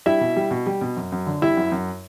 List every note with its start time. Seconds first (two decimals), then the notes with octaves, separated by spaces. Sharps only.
0.06 G3 E4 E5
0.21 B2
0.36 G3
0.51 B2
0.67 G3
0.81 B2
0.96 F#2
1.12 F#2
1.27 D3
1.42 G3 E4 E5
1.57 F#2
1.72 F#2